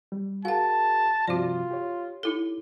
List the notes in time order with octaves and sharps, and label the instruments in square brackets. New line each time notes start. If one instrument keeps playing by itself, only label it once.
[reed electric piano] G3
[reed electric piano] F#4 G#4 A#4 [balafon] F5 F#5 [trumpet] A5
[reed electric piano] G2 C3 F3 [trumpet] F4 [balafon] F#4 D5
[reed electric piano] G4 C#5
[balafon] D#4 E4 A4